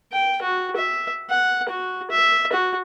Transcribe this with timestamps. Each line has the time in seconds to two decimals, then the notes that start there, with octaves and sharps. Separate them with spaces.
0.12 G5
0.42 F#4
0.76 E5
1.30 F#5
1.69 F#4
2.11 E5
2.53 F#4